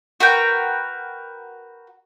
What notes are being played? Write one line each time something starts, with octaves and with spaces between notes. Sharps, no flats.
F#4 A#4 B4 G5